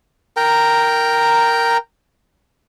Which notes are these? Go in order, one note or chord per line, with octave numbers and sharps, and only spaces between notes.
A#4 G5 A#5